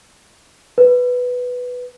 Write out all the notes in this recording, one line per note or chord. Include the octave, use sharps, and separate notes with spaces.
B4